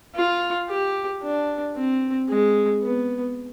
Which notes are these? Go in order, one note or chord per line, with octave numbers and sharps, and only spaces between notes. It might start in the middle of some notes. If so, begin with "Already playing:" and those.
F4
G4
D4
C4
G#3
B3